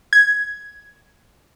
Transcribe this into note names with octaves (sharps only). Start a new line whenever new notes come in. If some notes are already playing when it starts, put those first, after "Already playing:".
G#6